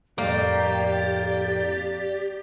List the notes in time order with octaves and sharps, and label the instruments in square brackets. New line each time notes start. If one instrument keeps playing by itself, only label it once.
[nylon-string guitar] F2 A2 A3 [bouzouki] A#3 [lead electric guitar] G4 [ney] D5